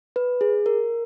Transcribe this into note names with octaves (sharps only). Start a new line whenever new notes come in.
B4
G#4
A#4